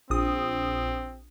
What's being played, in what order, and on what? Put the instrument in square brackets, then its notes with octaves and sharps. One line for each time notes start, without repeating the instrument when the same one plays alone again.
[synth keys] A#1 D#6 [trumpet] C4